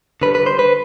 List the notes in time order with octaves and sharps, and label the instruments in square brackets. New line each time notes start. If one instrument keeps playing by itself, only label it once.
[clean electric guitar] D3 G3 B4
B4
C5
B4